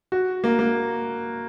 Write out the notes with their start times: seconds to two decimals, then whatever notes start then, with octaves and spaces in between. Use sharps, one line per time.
0.12 F#4
0.44 A#3
0.59 A#3